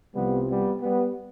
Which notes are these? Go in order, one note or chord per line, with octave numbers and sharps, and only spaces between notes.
C2 C3 F3 G3 B3
G3 B3
G3 B3